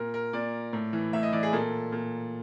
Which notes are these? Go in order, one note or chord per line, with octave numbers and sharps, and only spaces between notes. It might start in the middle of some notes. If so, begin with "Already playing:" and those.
Already playing: A#2 A#4
A#4
A#2 D5
A2
E3
A2 E5
D#5
E3 D5
G#4
A#2 A4
A#2